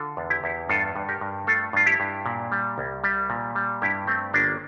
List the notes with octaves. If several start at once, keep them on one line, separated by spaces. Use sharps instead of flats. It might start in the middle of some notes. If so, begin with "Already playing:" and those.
Already playing: D3 F4 A4
E2
E4 G4
E2
G2 F4 A4
G2
G4 A#4
G2
A3 F4 A4
G2 F4
E4 G4
G2
A#2
G3
C2
G3
A#2
G3
G2 E4 G4
A3 C4
G1 A#3 D4